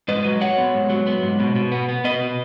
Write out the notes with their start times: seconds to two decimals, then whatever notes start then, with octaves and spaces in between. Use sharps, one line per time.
0.08 G#2 B4 D#5
0.25 F#3
0.41 F#3 C#5 F#5
0.58 B3
0.74 G#2
0.90 F#3
1.07 B3
1.23 G#2
1.40 B2
1.56 B2
1.72 B3
1.89 B3
2.04 B2 B4 D#5
2.21 B2